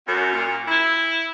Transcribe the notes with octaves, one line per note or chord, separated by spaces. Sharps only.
F#2
A#2
E4